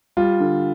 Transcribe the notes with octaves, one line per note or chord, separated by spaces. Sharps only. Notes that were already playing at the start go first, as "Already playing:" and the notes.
G3 F4
D3